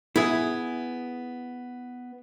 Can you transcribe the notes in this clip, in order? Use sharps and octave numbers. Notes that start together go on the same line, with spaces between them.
B3 E4 G#4